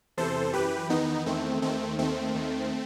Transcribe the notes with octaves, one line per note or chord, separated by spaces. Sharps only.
E2 C3 E3 A4 C5
F#2 E3 G4 B4
E2 D#3 B3 D#4
E2 D#3 A3 C4
D#2 D#3 A3 C4
D#2 D#3 A3 C4
D#2 D#3